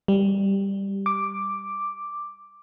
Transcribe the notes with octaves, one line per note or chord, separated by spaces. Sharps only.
G3
D6